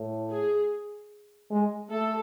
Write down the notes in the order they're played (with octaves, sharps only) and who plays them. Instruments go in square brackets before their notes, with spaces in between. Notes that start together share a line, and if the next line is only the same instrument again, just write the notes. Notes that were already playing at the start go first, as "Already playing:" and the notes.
Already playing: [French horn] A2
[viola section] G#4
[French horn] G#3
[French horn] A3 [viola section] A4